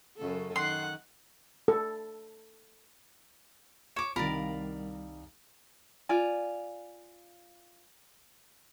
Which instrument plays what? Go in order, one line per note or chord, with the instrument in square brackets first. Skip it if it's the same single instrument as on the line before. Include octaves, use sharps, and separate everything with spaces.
[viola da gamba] F#2 C#3 A4
[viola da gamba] D#3 [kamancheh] F#5 F#6 [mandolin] C6
[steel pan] A4
[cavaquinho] C#5 D6 [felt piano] E7
[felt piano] C2 D#3 [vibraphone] G3 [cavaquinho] A#4 [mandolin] D5 F5 B5
[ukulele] F4 D5 G#5